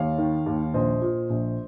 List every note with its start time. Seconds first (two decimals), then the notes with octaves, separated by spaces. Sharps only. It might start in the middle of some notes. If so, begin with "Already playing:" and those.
Already playing: D#2 C#5 F5
0.18 D#3
0.46 D#2
0.74 A#1 C5 D#5
1.02 A#2
1.30 A#1